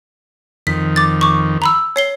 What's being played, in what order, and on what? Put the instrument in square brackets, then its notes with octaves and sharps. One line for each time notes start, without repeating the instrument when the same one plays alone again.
[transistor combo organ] F2 D#3 [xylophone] B6
[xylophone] D6 A6
C#6 D6
A#5 B5 E6
C#5 C7 G7